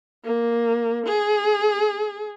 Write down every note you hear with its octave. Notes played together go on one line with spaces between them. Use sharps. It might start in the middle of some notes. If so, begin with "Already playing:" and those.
A#3
G#4